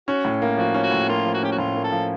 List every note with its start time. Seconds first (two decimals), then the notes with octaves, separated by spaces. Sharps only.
0.08 C#4 F#4
0.25 A2
0.42 A#3
0.58 F3 F#4
0.74 C#4
0.83 F#4
0.91 A2
1.09 A#3 F4
1.26 F3
1.34 F#4
1.42 C#4 G4
1.52 F#4
1.58 A2 F4
1.76 A#3
1.84 A4
1.92 F3